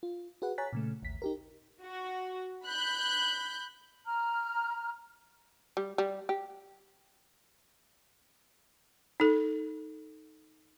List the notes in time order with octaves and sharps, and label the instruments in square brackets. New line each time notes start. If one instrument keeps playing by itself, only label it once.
[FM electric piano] F4
F#4 G#4 B4 F#5
C#5 G#5 A#5 F#6 A6 B6
A#2 C#3 A3
A1 D#2 B6
D#4 G4 A#4
[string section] F#4
B5 F#6 G6
[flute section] A#5 F6
[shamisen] G3
G3
G4
[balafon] D#4 A4